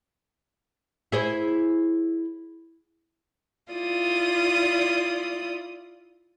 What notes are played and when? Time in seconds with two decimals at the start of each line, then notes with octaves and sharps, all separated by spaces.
1.12 E4 G#4 C5
3.71 E4 F4 D5 D#6